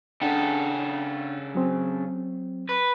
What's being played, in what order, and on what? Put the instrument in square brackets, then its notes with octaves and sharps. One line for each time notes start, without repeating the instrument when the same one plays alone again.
[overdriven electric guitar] C#3 A4 [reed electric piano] D4 F#5 G5
[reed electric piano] F#3 C4
[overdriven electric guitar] B4